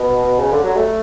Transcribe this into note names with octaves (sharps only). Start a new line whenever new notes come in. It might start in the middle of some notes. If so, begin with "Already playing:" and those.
Already playing: B2
C#3
D3
F#3
A3